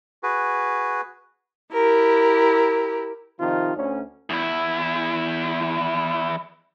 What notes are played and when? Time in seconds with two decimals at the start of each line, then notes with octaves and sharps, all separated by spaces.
0.23 F#4 G#4 B4
1.72 E4 G4 A#4
3.39 C3 D#3 F3 D#4 F4
3.76 D2 C#4
4.30 E2 E4